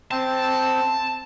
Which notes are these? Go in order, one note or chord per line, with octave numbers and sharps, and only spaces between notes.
C4 A5